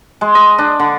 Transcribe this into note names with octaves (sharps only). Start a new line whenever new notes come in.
G#3
D#5
D4
D3